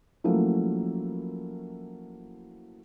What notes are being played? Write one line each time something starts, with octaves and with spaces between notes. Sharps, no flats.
F3 F#3 A3 A#3 C#4 E4